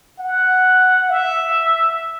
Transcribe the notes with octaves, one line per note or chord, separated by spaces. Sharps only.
F#5
E5